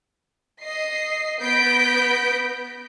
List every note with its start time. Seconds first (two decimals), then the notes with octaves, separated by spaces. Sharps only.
0.61 D#5 C7
1.40 B3 G6 A#6 B6 D7